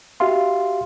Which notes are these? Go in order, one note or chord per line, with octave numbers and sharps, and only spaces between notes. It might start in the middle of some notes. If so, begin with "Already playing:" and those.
F#4 G4 E5 F5 C6